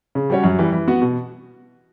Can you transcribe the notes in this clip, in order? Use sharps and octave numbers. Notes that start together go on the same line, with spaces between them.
C#3
G3 C#4 F#4 C#5
F#2
E3 G3
E3
B3 F#4
B2